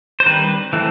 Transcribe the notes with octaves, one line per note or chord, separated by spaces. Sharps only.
C5
D#3 G3 C4 B4
E3 A3 C4